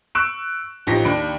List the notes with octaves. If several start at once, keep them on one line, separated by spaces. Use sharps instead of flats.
C#6 E6 F#6 D7 E7
A1 F3 D#4 G4 A#6 B6
D#2 D4 B5 D7